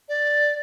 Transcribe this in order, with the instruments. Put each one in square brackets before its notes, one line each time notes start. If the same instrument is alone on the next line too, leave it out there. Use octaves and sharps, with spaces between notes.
[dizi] D5